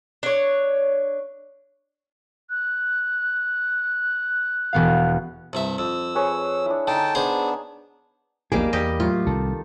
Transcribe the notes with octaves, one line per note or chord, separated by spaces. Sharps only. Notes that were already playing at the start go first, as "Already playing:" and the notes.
D4 C#5
F#6
E1 B3 F5
C2 G2 E5
F2 E6
G#4 B4 C#5
D4 E4
D3 D#4 G5 A5
B3 D4 G#4 C5
A#1 E2 A#2 G3 A#3 D#4 G#4 D6
E2 G3 G4 D#5
A2 F#3 F4
C2 D#3 A4